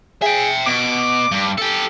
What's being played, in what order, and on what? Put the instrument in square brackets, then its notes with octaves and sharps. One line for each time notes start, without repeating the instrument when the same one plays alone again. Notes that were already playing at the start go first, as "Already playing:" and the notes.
[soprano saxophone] G#4 [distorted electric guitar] E5 G5
[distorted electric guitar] B2 [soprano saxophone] D6
[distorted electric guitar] G2
G4 A4